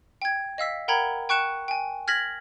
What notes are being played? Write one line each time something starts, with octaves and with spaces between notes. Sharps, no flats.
G5 G#6
D#5 F5 E6 B6
A#4 F#5 G5 A#5 B5 G#6
G5 C#6 F#6 C#7 E7
G5 G#5
F6 G#6 A#6 B6 F#7